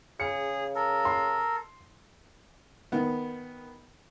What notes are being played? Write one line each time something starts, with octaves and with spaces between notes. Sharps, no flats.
C#3 G#4 C#7
A4 A#4
C6
D#3 B3